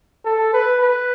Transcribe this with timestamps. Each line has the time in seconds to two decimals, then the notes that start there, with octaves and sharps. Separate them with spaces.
0.25 A4
0.53 B4
0.81 B4